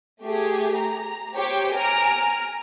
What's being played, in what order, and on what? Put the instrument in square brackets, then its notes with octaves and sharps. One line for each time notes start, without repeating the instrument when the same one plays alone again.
[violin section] A3 G4 G#4
A#5
G4 C5 C#5 G5
G#5 A#5 F6 D7